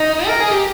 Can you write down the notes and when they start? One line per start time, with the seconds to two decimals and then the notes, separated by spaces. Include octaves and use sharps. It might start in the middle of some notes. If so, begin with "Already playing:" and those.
Already playing: D#4
0.27 A#4
0.40 G#4
0.51 G4